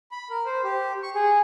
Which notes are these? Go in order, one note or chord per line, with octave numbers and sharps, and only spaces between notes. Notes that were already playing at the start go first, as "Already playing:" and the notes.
B5
A#4
C5
G4
C#6
G#4